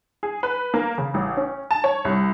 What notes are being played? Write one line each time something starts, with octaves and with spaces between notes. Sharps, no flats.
G#4
B4
A#3
C#3
A1
C#4
A5
C#5
C2